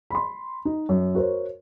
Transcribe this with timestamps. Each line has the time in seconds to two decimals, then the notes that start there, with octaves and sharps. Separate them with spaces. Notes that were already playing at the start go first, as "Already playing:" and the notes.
0.10 B5 C6
0.65 D#4
0.89 F#2
1.15 F#4 A#4 C5 C#5